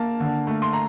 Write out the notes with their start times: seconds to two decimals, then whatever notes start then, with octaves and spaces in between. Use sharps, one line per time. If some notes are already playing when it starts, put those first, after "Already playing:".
Already playing: A#3 A5
0.20 D3
0.47 A3
0.62 C6
0.73 A#5